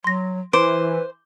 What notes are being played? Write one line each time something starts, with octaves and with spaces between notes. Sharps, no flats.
F#3 C6 A#6
E3 B4 C5 D6 D7